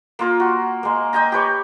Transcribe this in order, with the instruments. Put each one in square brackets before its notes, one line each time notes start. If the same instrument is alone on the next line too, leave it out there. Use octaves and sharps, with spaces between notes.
[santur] A#3 F4 A#4
F#4
G#3 A#3
D#5 G5 G#5 A#5
G4 B4 C#5 D6